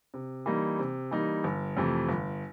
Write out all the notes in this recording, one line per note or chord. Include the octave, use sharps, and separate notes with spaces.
C3
E3 G3 A#3 D#4
C3
E3 G3 A#3 D#4
G1
F2 C3 E3 A3
G1